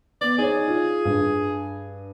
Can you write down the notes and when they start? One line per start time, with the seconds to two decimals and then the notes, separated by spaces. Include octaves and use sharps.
0.21 B3 D5
0.38 D#4 G#4 C#5
0.68 F4
1.05 G2